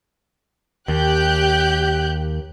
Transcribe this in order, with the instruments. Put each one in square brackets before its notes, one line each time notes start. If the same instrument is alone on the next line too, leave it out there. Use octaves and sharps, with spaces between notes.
[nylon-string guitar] D#2 [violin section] G4 F#6 G6